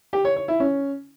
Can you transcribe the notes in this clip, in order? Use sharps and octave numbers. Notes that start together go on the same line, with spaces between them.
G4
C#5
C#5
E4
C#4